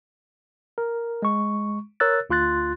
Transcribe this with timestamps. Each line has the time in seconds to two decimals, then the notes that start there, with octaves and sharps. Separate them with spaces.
0.78 A#4
1.22 G#3 C#6
2.00 A#4 C#5 E6 F#6 A6
2.30 D2 F4 C6 F#6 A6